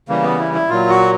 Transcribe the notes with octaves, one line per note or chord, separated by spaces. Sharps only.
C#3 E3 G3 A#3
B3
E4
E4
A#2 F#3 F4
F#4